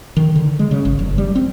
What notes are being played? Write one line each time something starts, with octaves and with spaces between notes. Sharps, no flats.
D#3
D3
G#3
C#3
G#1
F#1
G3
C4